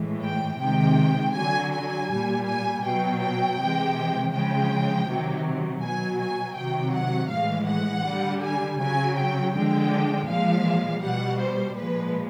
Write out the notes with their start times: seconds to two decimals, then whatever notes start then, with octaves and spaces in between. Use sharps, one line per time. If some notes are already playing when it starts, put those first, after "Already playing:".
Already playing: A2 E3 G#3
0.23 G5
0.60 C3 D#3 G#3 G5
1.34 D3 F#3 G#5
1.72 G#5
2.09 A#2 G3
2.46 G#5
2.84 B2 F#3 G5
3.21 G5
3.58 C3 E3 G#3
4.32 C#3 F3 G#3 G5
5.07 C3 D#3 F#3
5.81 B2 F#3 G#5
6.20 G#5
6.57 C3 D#3 F#3 G5
6.93 F#5
7.30 A2 E3 G#3 F5
7.67 F#5
8.05 D3 G3
8.42 G#5
8.80 C#3 F#3 G#5
9.17 G5
9.54 D3 F3 G#3 G5
10.29 A#2 F3 G#3 F5
11.03 B2 G3 F#5
11.40 C5
11.77 A#2 F3 G#3 B4